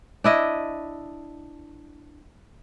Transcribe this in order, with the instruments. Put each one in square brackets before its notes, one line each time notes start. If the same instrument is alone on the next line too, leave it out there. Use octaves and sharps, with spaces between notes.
[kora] D4 E4 D#5